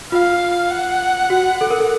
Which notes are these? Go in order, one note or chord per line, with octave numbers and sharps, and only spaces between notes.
F4 F5
F#5
F#4
A4
A#4
A4